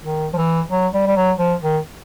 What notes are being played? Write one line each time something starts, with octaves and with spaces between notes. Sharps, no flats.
D#3
F3
E3
F#3
G3
G3
F#3
F3
D#3